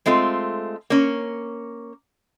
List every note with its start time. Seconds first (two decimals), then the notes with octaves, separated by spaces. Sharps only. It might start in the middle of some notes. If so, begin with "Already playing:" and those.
0.06 G#3 A3 C4 F4
0.90 A#3 C#4